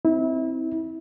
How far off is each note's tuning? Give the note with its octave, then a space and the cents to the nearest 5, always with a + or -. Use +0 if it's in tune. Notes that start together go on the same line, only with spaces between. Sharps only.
C4 +0 E4 -30